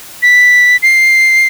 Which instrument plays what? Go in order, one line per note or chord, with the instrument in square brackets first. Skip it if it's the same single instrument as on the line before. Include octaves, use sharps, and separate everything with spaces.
[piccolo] B6
C7